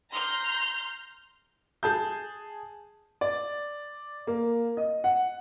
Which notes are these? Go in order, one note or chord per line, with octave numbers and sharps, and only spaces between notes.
A#5 C6 F6 G6
G#4 A5 G6
D5
A#3
D#5
F#5